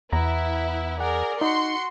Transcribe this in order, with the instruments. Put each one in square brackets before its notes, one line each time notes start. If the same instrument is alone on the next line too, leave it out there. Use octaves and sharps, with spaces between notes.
[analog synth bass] E2 [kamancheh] B3 E5 [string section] E4 [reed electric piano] A#5
[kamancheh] G#4 D5 [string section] A#4 [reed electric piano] F#5
[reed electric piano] D#4 [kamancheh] F#4 [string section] C6 C#7